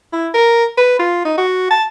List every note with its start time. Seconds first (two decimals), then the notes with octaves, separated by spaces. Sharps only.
0.13 E4
0.34 A#4
0.77 B4
0.99 F4
1.25 D#4
1.37 F#4
1.70 A5